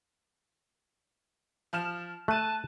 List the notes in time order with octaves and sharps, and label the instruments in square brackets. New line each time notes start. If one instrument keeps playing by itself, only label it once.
[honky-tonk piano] F3 F6 E7
[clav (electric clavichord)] A3 [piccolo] A5 [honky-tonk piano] F#6 D#7